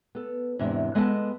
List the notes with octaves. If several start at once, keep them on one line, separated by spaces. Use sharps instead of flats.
B3 A4
E2 G#2 C3 D4 E5
G#3 B3 A4 D#5 F#5 A5